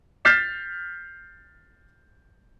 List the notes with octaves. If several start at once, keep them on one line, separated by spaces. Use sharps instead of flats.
F6 G6 A6 B6 C7 E7